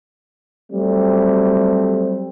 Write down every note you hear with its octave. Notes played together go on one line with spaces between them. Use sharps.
F#3 G3 A3 C4